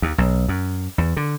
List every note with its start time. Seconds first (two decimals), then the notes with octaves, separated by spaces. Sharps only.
0.02 D#2
0.18 B1
0.48 F#2
0.98 E2
1.17 D3